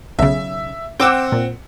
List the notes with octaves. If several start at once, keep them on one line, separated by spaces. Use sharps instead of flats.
B1 C#3 E5
C4 F#5 G5 D6 E6
A#2